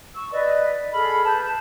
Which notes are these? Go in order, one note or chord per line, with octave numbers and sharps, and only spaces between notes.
C#6 E6
B4 D5 D#5
G#4 A4 B5 F6
B4 A5 G6